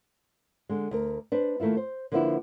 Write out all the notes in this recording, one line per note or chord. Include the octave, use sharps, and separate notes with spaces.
D3 G#3
D2 A#4
D4 B4 C5
D#3 A3 A#3 E4 F4
C5
D3 F3 A#3 B3 D4 E4